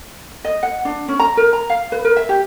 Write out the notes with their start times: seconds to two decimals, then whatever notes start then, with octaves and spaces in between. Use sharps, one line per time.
0.44 D#5
0.63 F#5
0.85 D4
1.08 C#4
1.19 A#5
1.37 A#4
1.53 A#5
1.70 F5
1.92 B4
2.05 A#4
2.16 E5
2.29 G4